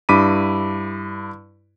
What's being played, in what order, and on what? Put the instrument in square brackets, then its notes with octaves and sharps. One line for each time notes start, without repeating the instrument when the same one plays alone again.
[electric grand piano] G2 E4 B5 D6 B6 D#7